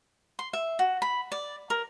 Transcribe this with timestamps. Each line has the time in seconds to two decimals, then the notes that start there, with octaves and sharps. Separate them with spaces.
0.39 C6
0.53 E5
0.79 F#4
1.02 B5
1.32 D5
1.70 A#4